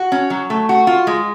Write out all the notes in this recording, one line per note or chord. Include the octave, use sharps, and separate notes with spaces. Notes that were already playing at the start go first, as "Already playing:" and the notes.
Already playing: F#4
C#4
F#3
A3
F#4
F4
G#3